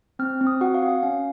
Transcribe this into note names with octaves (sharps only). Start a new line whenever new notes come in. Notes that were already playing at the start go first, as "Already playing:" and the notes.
C4 F6
C4
D#6
F#4 F#5
F5
F#4
F5
C#4 F5